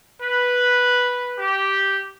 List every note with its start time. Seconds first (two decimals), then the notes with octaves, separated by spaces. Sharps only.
0.21 B4
1.38 G4